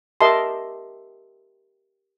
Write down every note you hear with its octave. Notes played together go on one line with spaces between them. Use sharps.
G4 A#4 D#5 E5 A5 C6